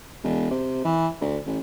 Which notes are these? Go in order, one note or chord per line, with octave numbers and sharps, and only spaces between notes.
E1
C3
E3
D2
A1